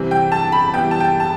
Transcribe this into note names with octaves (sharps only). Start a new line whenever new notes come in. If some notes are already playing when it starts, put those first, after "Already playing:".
Already playing: C3 E3 G3 C4
G5
A5
B5
E3 G3 B3 G5
A5
G5
A5